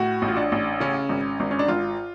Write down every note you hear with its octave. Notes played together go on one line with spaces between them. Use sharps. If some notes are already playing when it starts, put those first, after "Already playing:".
Already playing: A2 F#4
A1
F4
D4
A1
C#3 C#4
G#1
G#1
C#4
D4
G#1 F4